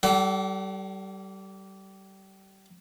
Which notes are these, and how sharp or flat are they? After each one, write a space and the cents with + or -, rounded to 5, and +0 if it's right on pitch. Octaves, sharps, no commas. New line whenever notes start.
G3 -25 A4 +5 F#5 +35